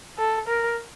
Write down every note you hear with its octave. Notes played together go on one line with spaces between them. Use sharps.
A4
A#4